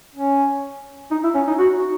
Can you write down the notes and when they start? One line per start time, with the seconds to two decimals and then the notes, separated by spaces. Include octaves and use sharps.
0.15 C#4
1.11 D#4
1.24 E4
1.35 C#4
1.47 D#4
1.59 F#4